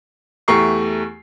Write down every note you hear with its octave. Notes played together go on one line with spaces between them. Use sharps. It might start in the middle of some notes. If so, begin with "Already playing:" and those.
E2 A3 G4 A#5 C#6 C7